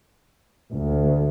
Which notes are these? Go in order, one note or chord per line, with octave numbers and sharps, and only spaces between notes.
D2